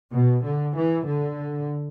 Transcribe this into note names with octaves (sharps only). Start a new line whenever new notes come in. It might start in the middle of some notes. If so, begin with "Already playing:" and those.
B2
D3
E3
D3